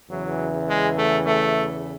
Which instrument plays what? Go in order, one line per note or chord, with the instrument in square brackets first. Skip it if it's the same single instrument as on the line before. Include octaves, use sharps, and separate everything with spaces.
[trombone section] E2 C#3 E3 F#3
G#3
A3
A3